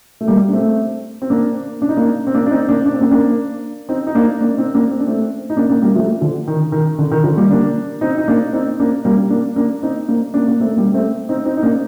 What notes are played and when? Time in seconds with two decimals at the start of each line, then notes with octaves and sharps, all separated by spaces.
0.21 A3
0.28 G3 A#3
0.48 D4
0.53 A3 C4
1.22 C4
1.30 A#3 D4
1.82 D4
1.89 D#4
1.96 A#3 D4
2.27 C4
2.34 A#3 D4
2.46 D4
2.51 C4 D#4
2.68 A#3 D4
2.86 D4
2.93 C4
3.01 A#3 D4
3.11 A#3 D4
3.89 C4 D#4
4.07 D#4
4.15 A#3 D4
4.41 A#3 D4
4.58 C4 D#4
4.75 A#3 D4
4.91 C4
5.00 D4
5.07 A3 C4
5.50 D#4
5.57 A#3 D4
5.69 A#3 D4
5.82 G3 A#3
5.95 F3 A3
6.21 D3 F3
6.48 D#3
6.72 D#3
6.98 D3
7.11 D#3
7.24 D3 F3
7.37 G3 A#3
7.50 A#3 D4
8.01 C4 D#4
8.18 D#4
8.28 A#3 D4
8.53 C4 D#4
8.80 A#3 D4
9.05 G3 A#3
9.30 A#3 D4
9.56 A#3 D4
9.83 C4 D#4
10.09 A#3 D4
10.34 A#3 D4
10.48 A#3
10.60 A3 C4
10.77 G3 A#3
10.94 A3 C4
11.29 C4 D#4
11.45 C4 D#4
11.57 D#4
11.63 A#3 D4